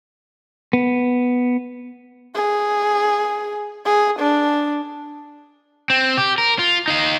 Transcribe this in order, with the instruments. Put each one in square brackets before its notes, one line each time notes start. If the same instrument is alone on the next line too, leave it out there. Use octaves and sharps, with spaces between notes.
[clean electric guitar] B3
[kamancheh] G#4
G#4
D4
[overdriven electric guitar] C4
G4
A#4
F4
D#4 F5